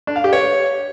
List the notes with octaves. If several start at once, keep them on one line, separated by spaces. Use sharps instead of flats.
D4
F5
G4
C#5